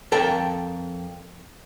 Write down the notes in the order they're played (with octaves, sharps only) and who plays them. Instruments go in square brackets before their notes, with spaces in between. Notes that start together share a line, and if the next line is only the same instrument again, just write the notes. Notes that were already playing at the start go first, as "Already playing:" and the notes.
[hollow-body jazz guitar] F2 A4 A#4 G5